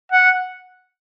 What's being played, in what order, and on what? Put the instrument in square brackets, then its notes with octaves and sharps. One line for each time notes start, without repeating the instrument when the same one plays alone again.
[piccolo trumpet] F#5